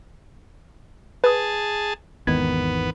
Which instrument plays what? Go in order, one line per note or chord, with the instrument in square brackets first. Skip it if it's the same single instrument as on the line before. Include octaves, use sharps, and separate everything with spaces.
[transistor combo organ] G#4 A5 [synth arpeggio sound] B4 D#6
[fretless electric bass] G#1 E2 D#3 [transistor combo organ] B3 [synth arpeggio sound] G#6